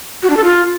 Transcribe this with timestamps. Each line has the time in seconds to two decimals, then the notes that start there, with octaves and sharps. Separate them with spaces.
0.23 F#4
0.30 D4
0.37 A4
0.44 F4